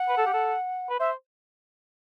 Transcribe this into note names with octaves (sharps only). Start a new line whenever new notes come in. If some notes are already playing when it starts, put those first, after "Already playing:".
Already playing: F#5
B4
A4
G4
A4
B4
C5 E5